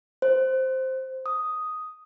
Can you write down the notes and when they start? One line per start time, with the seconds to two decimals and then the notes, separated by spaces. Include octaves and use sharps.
0.22 C5
1.26 D#6